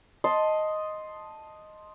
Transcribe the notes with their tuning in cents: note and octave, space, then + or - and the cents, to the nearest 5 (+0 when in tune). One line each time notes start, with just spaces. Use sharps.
D#5 +0 A5 +0 C6 +5